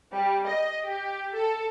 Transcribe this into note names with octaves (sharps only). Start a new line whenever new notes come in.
G3
D#5
G4
A4